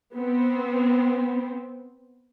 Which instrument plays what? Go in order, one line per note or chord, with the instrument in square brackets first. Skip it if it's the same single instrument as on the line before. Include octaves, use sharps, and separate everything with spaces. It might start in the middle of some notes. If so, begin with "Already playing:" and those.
[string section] B3 C4